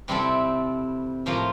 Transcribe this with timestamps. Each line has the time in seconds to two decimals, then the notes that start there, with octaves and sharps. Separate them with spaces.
0.08 C3 G3 C4 E4 A4
1.26 A2 F3 A#3 F4